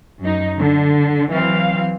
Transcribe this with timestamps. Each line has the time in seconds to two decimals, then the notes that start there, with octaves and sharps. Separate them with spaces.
0.20 F#2 D#4
0.58 D3
1.32 E3 F#3 C4 F5